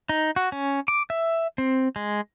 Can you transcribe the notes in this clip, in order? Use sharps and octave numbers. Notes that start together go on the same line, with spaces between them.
D#4
F#4
C#4
D6
E5
C4
G#3